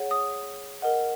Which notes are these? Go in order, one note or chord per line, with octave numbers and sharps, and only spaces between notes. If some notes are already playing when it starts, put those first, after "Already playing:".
Already playing: G#4 C#5 F#5
D#6
A#4 D#5 F#5